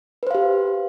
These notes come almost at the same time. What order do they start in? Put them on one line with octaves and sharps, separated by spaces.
B4 C5 F5 G4